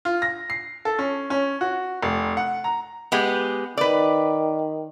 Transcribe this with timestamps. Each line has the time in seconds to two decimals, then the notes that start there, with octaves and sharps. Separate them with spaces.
0.05 F4
0.22 A#6
0.50 C7
0.85 A4
0.99 C#4
1.30 C#4
1.61 F#4
2.02 F1
2.37 F#5
2.64 A#5
3.12 G#3 B3 G4
3.78 D#3 B4 D5